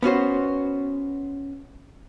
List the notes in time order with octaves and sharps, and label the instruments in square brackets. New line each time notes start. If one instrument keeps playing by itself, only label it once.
[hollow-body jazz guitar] B3 C#4 F#4 C5